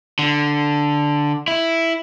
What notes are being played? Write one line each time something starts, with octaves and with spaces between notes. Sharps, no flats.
D3
E4